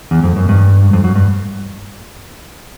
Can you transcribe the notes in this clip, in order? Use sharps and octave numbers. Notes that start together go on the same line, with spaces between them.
E2
F2
F#2
G2
F2
F#2
G2